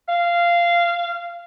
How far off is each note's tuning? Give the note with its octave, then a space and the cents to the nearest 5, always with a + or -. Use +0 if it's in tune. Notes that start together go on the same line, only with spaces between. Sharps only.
F5 -15